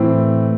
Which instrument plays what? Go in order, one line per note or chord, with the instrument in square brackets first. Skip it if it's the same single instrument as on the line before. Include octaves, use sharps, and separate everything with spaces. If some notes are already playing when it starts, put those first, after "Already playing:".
Already playing: [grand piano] A2 E3 C4